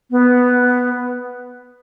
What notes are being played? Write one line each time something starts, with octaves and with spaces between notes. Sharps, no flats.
B3